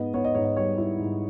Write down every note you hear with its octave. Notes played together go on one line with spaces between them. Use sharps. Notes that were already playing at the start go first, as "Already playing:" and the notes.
Already playing: G#2 B3 D#5
B3 C#5
D#5
G#2 C#5
D#5
G3 C#5
E4
G#2